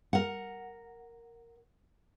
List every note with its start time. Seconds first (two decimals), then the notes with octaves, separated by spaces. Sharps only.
0.13 A#4 F#5